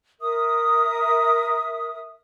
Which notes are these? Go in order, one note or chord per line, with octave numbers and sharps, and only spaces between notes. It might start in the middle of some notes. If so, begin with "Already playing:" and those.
A#4 E5 D#6